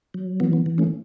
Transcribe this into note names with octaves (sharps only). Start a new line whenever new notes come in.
F#3
E3 B3
B3
E3
A3 C#4